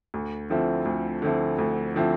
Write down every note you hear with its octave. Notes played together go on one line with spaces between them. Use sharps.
D2
D3 F3 C4 E4
D2
D3 F3 C4 E4
D2
D3 F3 C4 E4